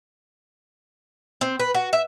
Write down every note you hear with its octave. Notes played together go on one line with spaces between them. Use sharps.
C4
B4
F#4
E5